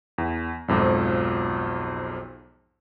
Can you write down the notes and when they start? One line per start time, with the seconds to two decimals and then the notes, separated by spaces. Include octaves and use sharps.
0.18 E2
0.68 B1 F2 G#2 F3